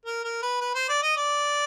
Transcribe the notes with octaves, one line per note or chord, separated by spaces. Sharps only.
A#4
A#4
B4
B4
C5
D5
D#5
D5